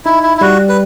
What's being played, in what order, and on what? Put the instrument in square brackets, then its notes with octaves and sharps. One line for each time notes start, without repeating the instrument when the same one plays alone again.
[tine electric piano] D#4 [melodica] E4
[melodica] E4
E4
[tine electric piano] G3 [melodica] F#4
[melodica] B4